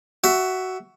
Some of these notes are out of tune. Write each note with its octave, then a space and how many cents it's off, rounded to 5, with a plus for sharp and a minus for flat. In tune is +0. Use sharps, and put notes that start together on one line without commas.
F#4 +10 E5 +0